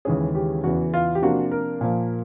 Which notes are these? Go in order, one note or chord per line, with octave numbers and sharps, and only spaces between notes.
D#2 C#3 E3 G#3 C#4 G#4
G4
E2 C#3 E3 F#4
F4
G4
C3 F3 A#3 D4 F4 F#4
A#4
A#2 F3 A#3